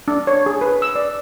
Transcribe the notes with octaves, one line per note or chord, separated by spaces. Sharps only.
D4
C#5
G#4
B4
E6
D5